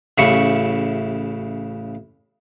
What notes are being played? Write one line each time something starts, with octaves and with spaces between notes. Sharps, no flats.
A1 C#3 E4 G4 C#6